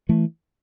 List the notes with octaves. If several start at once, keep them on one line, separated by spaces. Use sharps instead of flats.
E3 A3